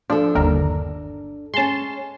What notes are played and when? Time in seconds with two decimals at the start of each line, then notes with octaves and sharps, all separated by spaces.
0.10 F3 D4 A4
0.35 G1 D#2 A#4
1.54 G#3 C#4 A5 C6